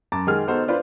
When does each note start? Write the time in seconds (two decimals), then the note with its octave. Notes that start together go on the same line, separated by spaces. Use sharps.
0.12 F#2 A5 A#5 D6 A6
0.27 D#3 G#3 G#4 F#5 G#5 F6
0.47 B3 D#4 F#4 A4 C5
0.68 D4 F4 B4 C5 D5